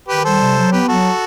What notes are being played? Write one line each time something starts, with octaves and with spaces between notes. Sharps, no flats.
D#3 G4 B4
G3 A4 C5
C3
F#3
B3 G4 B4
F#3 F#4 A4